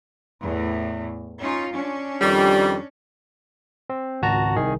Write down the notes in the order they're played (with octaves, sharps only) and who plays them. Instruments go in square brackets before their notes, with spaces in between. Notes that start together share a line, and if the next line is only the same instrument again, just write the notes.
[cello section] E2 A2
C#4 D#4 F4
C#4 D4
[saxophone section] F2 D#3 G3
[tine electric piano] C4
G#1 C#2 F#4 A5 A#5
C2 D#3 G#4